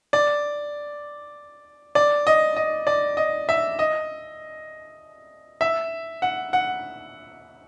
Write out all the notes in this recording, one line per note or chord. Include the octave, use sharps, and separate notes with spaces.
D5
D5
D#5
D#5
D5
D#5
E5
D#5
E5
F#5
F#5